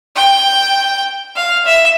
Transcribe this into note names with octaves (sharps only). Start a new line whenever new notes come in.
G5
F5
E5